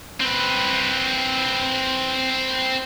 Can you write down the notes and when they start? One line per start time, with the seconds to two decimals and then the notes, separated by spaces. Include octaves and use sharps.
0.20 C4 B4